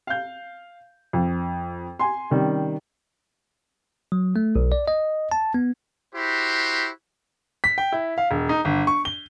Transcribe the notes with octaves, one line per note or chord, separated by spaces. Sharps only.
F5 G6
F2
G#5 C6
C3 D#3 G3 C#4
F#3
A3
B1
D5
D#5
A5
B3
E4 F#4 G4 C5
B6
G5
E4
F5
E1
D#4
G1
C#6
G7